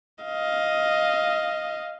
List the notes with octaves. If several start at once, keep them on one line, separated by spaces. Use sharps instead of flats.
D#5 F5